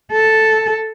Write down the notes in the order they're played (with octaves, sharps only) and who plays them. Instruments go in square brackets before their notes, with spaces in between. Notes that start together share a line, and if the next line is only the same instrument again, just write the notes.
[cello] A4